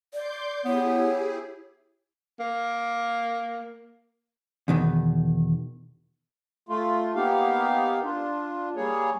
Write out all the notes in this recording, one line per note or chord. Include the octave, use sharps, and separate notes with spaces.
D5 C6 D6 G6
B3 E4 G4 G#4 C#5
A#3
E2 B2 D#3
A3 F4
A#3 B3 D#4 G4 F5
D4 F4
G3 A#3 G#4 C#5